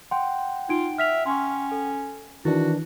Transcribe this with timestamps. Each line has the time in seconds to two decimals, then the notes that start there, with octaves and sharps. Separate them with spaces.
0.11 F#5 G5 C6
0.69 D#4 F4 D7
0.98 E5 F6 B6 F7
1.26 C#4 C6 C#6
1.71 A4
2.45 D#3 E3 D4 E4 F#4